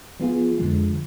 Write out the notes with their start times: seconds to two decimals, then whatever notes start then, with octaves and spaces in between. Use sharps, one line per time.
0.20 F3 B3 F4 G#4
0.58 F2 D3 F3 G#3